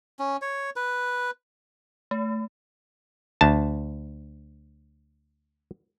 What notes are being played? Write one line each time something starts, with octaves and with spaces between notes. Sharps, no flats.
C#4
C#5
B4
A3
D2 A5